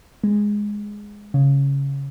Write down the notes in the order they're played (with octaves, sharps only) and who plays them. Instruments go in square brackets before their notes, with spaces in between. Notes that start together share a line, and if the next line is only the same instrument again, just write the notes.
[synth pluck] G#3
C#3